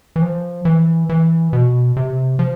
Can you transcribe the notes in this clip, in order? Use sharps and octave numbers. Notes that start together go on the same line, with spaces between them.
E3
F3
E3
E3
B2
C3
F3